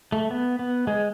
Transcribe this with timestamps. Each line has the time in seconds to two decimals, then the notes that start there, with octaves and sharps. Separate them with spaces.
0.12 A3
0.31 B3
0.59 B3
0.87 G#3